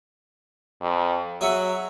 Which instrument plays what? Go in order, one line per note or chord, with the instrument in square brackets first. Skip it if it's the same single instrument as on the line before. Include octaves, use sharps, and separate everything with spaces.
[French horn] F2
[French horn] F#3 [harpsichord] G#4 E5 F#5